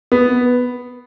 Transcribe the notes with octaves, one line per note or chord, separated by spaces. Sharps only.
B3